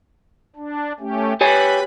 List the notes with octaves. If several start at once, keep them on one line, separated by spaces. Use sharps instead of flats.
D4
A3 C#4 G4
G4 B4 C#5 G#5 B5